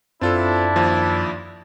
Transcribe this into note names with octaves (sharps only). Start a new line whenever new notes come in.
F#2 C4 D4 E4 F4 A4
D#2 F3